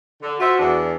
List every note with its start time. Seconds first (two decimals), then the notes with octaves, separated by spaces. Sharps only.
0.23 D3
0.40 F4 F#4 C5 E5
0.58 E2 D4